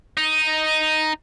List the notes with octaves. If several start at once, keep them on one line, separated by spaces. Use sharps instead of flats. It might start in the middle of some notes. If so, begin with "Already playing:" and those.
D#4